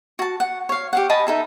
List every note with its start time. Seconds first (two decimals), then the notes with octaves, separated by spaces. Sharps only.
0.19 F#4 A5
0.40 F#5
0.69 C#5 F5
0.93 G4 F5 F#5
1.10 D#5 G#5 A5 B5
1.27 D#4 A4 E5